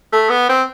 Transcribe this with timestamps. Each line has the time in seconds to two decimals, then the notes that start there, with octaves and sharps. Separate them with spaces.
0.12 A3
0.30 B3
0.49 C4